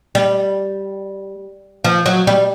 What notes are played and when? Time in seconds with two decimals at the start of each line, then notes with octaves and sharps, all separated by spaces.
0.15 G3
1.84 F3
2.06 F#3
2.27 G3